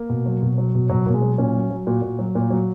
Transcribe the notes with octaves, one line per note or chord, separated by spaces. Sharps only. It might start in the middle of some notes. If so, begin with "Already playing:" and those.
Already playing: A#3
B2
F#3
B2
F#3
B2
B2 F#3
B2 A#3
G#3
F#3
A#2 C#4
F#3
F#3
A#2 F#4
A#2
F#3
A#2
F#3